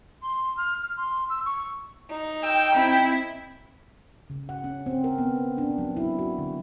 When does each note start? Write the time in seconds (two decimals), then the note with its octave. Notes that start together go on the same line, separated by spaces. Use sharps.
0.23 C6
0.57 F6
0.83 F6
0.97 C6
1.30 E6
1.46 C#6
2.10 D#4
2.43 G5 E6
2.75 C4 E4
4.30 C#3
4.49 F#5
4.64 C#4
4.86 C4
5.04 A#4
5.18 B3
5.58 D4
5.78 F#3
5.96 E4
6.19 F#4
6.38 D3